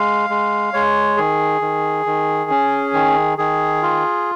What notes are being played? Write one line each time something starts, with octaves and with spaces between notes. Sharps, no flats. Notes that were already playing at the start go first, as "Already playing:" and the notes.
Already playing: G#3 F5
G#3
G#3 C#5
D#3 G#4
D#3
D#3
C#4
D#3
D#3 G#4
F4